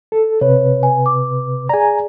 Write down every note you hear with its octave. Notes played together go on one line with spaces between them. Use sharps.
A4
C3 B4 C#5
G#5
D6
G#4 D5 G#5 A#5